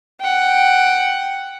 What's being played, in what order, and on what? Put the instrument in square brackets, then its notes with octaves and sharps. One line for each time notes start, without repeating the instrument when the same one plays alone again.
[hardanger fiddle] F#5 G5